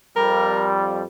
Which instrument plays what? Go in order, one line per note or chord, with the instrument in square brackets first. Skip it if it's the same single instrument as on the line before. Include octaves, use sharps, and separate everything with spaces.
[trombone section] F2 G3 [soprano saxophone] A#4